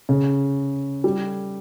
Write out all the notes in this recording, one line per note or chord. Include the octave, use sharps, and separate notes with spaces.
C#3
G3